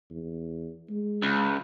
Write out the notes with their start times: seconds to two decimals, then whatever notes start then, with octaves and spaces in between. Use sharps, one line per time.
0.10 E2
0.90 G#3
1.22 C#2